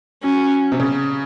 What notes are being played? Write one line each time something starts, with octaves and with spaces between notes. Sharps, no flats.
F#3 C#4
C3
C#3